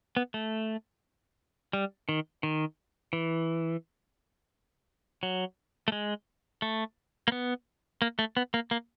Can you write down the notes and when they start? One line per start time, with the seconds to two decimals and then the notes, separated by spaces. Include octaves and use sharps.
0.17 B3
0.34 A3
1.73 G3
2.09 D#3
2.43 D#3
3.13 E3
5.23 F#3
5.88 A3
5.92 G#3
6.62 A3
7.28 A#3
7.32 B3
8.02 A#3
8.19 A3
8.37 B3
8.54 A#3
8.71 A#3